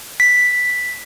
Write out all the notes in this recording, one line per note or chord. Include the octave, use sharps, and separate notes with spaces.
B6